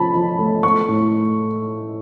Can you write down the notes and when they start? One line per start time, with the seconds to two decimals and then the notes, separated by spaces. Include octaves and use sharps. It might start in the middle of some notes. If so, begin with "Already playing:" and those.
Already playing: F3 A3 C#4 A5 B5
0.15 F3
0.39 A3
0.63 A3 C#6
0.89 A2